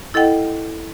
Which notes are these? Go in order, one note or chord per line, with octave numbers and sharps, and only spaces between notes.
E4 A4 D#5 F#5 G5